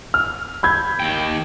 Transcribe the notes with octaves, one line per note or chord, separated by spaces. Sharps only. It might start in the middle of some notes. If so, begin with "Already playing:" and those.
F6
B5 G6 G#6
D#2 G5